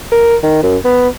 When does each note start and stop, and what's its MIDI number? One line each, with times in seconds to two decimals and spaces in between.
0.12 0.36 70
0.43 0.61 51
0.63 0.77 42
0.85 1.08 59